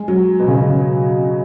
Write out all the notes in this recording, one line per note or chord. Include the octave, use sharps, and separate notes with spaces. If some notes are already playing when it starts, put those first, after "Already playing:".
Already playing: G#3
F#3
B2
C#3
B2
C#3